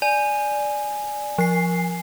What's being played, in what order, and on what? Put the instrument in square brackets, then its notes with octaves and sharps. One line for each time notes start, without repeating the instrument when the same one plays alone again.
[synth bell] D5 [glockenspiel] G#5
[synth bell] F3 C7